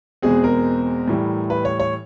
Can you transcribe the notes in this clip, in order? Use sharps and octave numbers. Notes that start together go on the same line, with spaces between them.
E2 B2 G#3 C4 G#4
A#4
A2 E3 G3
B4
C#5
C#5